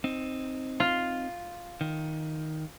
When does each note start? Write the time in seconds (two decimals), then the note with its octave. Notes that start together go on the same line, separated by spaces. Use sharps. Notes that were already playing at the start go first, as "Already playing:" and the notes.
0.04 C4 D#4
0.80 F4
1.81 D#3